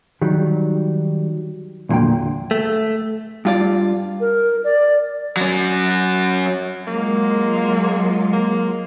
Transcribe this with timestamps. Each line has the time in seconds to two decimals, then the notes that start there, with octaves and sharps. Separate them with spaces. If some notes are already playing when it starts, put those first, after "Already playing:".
0.22 D#3 F#3 G3
1.89 B1 E2 A#2 D3 F#3 G5
2.51 A3
3.45 G2 F4 D5
4.20 A#4
4.64 D5
5.37 F#3 C#4
6.87 F#3 G#3 A#3 F4
8.33 A#3